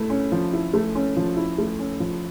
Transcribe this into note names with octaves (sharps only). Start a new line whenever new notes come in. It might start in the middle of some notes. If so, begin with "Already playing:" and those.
Already playing: A3 E4
C#4
F3
E4
A3
C#4
F3
E4
A3
C#4
F3